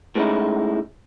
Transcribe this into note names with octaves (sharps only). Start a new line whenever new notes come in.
A2 G#3 B3 C#4 D#4 E4